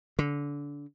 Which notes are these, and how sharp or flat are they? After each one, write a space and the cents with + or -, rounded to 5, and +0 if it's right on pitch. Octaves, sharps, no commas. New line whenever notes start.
D3 -25